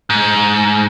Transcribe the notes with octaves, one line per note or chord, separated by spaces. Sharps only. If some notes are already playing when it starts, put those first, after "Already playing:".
G#2